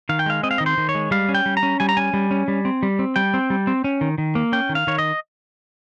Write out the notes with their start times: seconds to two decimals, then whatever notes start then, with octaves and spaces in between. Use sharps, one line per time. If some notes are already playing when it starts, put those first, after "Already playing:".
0.09 D#3 F5
0.19 G5
0.26 G#3 F5
0.43 C4 D#5
0.51 F5
0.58 D#3 D#5
0.66 C5
0.78 D#3
0.89 C#5
0.95 G#3
1.11 G3 F5
1.29 C#4
1.35 G5
1.46 G3
1.57 A#5
1.63 C#4
1.80 G3 G#5
1.89 A#5
1.97 C#4 G#5
2.14 G3
2.31 C#4
2.48 G3
2.65 C4
2.83 G3
2.99 C4
3.16 G3 G5
3.34 C4
3.50 G3
3.67 C4
3.84 C#4
4.01 D#3
4.18 D#3
4.35 A#3
4.52 C#4 G5
4.69 D#3
4.75 F5
4.87 D#3 C#5
4.98 D#5